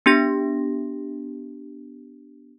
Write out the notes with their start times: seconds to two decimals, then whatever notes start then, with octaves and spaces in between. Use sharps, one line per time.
0.06 B3 D4 G4 A#6